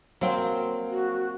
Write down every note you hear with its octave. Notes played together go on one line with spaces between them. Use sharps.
F#3 A#3 C4 F5
F#4